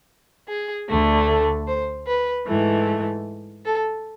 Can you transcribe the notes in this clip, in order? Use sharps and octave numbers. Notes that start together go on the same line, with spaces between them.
G#4
D2 D3 A3
A4
C5
B4
G#2 E3 A3
A4